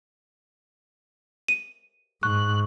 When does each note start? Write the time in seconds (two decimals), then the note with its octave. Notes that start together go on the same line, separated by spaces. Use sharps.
1.48 D#7
2.23 G#2 C#6 F#6